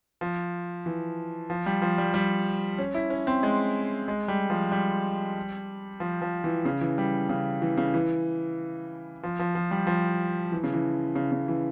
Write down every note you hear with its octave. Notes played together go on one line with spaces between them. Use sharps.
F3
E3
F3
G3
F3
G3
G3
C#4
E4
C#4
C4
G#3
G#3
G3
F3
G3
F3
F3
E3
C#3
E3
G3
C#3
E3
C#3
E3
F3
F3
F3
G3
F3
E3
C#3
E3
C#3
C#3
E3